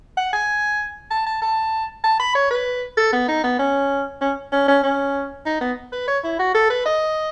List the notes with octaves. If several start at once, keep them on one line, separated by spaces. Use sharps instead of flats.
F#5
G#5
A5
A5
A5
A5
B5
C#5
B4
A4
B3
D#4
B3
C#4
C#4
C#4
C#4
C#4
D#4
B3
B4
C#5
E4
F#4
A4
B4
D#5